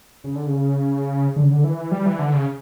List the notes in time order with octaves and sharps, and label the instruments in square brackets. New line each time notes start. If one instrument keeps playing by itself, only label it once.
[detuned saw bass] C#3
D3
C#3
D3
C#3
D3
E3
G3
E3
D3
C#3